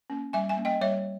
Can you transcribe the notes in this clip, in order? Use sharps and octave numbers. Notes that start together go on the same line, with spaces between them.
A#3 C#4
G3 E5 G#5
E5 G#5
A#3 C#4
D#5 G5
G3 C#5 E5